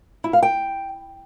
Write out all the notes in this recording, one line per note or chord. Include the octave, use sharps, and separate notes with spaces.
E4
F5
G5